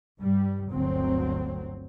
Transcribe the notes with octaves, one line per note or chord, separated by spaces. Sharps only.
G2 G3
G1 D2 F#3 C4